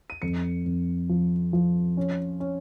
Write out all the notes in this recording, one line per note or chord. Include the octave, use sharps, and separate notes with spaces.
D#7
F2 C#7
F2
F3
F3
C#4
C#4